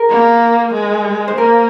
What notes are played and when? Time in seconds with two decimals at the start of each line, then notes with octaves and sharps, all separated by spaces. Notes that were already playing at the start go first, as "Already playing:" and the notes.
Already playing: G#4 A#4
0.10 A#3
0.73 G#3
1.28 C5
1.37 A#3 A#4